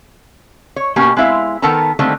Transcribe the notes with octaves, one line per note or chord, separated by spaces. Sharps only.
C#5
B2 A#3 C#4 G4
G#3 C4 E4 E5 F5
D#3 B3 A4 A#4 A5 A#5
D3 D#3 G3 A3 A#3 C4